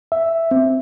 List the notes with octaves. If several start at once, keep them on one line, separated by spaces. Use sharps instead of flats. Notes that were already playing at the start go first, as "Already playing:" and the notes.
E5
C4